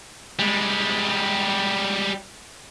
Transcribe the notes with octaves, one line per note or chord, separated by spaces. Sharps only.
G3 G#3